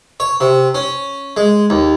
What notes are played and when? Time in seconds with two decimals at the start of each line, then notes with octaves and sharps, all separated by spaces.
0.20 C#5
0.40 C3
0.75 C#4
1.37 G#3
1.70 D#2